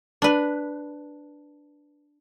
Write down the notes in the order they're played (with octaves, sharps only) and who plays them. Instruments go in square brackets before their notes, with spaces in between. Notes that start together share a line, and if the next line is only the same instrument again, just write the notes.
[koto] D4 B4